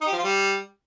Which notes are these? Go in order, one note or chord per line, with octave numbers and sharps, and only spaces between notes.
D#4
G4
F3
F4
G3